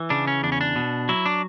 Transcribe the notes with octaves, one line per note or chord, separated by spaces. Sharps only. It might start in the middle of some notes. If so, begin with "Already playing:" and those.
Already playing: E3
C#3 D4
C#4
E2 D4
C#4
D4
B2
F#3 E4
D4